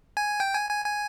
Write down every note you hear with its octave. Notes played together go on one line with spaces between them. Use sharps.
G#5
G5
G#5
G#5
G#5